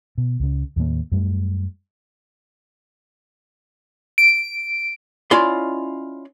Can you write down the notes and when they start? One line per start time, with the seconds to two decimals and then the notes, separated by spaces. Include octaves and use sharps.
0.18 B2
0.40 C#2 C#3
0.76 D#2 A2 D#3 A#3
1.12 F#2 G3 A3
4.18 D7
5.31 C#4 E4 F4 D5 D#5 C6